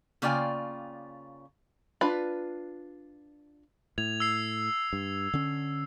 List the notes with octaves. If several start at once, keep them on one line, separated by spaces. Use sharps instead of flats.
C#3 A#3 F4 D5 G5 G#5
D4 F4 B4 B5
A2 G#6 F7
E6 C7
G2
D3 C#4